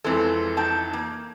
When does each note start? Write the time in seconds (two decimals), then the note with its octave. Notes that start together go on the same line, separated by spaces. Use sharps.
0.04 F2 E3 G#3 C4 A4
0.57 D#4 G5 A5
0.93 A#3